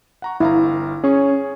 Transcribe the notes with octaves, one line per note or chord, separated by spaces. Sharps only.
F#5 A#5 C#6
G1 E4 F5 A#5
C#4 G#4 C#6